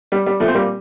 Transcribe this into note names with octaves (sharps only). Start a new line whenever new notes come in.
G3
G3
A#2 F3 A3
C4
G3 A#3